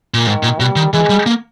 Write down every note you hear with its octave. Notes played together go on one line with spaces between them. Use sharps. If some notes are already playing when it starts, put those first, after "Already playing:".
A#2
G#2 D#3
A#2
B2 G3
D#3
E3 G#3
G3
A#3